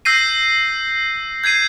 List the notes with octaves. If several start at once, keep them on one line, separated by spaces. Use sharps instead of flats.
E6 G6 A#6 C7 D#7
G6 G#6 C7 D#7